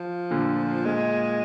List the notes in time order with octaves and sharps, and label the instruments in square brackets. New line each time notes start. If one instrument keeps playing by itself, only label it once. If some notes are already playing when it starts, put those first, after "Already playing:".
Already playing: [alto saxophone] F3
[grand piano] A#2 D3
[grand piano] A#2 [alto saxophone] G#3